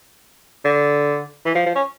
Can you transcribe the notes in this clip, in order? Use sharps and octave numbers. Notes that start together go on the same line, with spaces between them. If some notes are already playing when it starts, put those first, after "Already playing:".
D3
E3
F3
F3
C#4